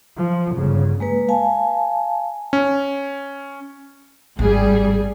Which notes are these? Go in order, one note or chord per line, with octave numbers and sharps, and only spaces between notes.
F3
G1 C#3
G#3 A#3 B4
F5 G#5 A5
C#4
G#1 A2 G3 G#4